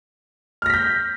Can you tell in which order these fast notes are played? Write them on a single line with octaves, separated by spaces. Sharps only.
F6 A#6 B6 G6